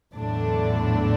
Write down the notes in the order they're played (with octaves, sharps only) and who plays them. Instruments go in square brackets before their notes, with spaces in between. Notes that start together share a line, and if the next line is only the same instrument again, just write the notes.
[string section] E2 D3 F#3 A3 D4 [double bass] A2